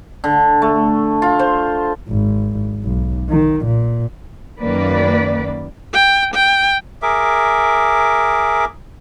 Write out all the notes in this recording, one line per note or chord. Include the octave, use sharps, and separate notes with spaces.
D3
A3
F4
C5
G#1
B1
D#3
A#2
F#2 D#3 A#3 B4 D5
G5
G5
G#4 A#4 E5 D6